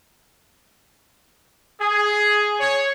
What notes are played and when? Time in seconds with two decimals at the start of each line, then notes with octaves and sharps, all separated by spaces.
1.80 G#4
2.59 C#5